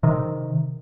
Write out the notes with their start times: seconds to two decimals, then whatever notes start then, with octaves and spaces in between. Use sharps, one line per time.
0.03 C3 D#3